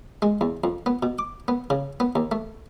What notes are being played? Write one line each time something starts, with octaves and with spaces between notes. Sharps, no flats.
G#3
E2
F2
B3
B2
D6
B3
C#3
B3
D#2
A3